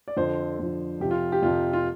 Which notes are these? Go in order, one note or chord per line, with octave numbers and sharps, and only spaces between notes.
D5
F2 D3 F3 C5
F2 D3 F3
F2 C3 F3 G4
F4
G4
F2 C3 F3 F4
F4